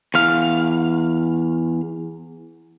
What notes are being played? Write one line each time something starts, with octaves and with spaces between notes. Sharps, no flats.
E2 F5